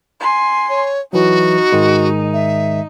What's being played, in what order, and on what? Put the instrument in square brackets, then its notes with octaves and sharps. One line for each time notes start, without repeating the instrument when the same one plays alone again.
[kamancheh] G#5 C6
[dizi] C#5
[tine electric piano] E3 F#3 [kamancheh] D#4 [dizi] F#4
[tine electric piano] G#2 D#3 G#3
[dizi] E5